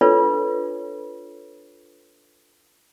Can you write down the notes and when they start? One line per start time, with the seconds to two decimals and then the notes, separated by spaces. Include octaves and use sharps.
0.01 D4 F4 A4 B4 C#5